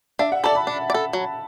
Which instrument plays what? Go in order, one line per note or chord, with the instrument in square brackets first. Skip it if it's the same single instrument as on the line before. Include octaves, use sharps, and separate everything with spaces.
[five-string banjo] D4 [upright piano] E5
[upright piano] F#5
[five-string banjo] A4 D5 [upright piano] A5
[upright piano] B5
[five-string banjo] D4
D5
A4
F#3